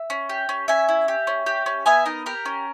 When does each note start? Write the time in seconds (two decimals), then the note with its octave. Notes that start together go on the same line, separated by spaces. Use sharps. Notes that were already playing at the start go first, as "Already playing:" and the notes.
Already playing: E5
0.10 C#4
0.30 G4
0.49 C#4
0.68 C#4 E5 G#5
0.89 E4
1.08 G4
1.27 C#4
1.46 G4
1.66 C#4
1.86 B3 E5 G#5
2.06 D#4 A#4
2.26 G4 A#4
2.46 C#4